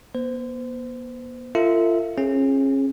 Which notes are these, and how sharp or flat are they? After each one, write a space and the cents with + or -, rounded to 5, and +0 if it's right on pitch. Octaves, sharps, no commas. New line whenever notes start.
B3 -45 C5 -30
F4 -25 A4 +45 E5 -20
C#4 -35 G#4 +0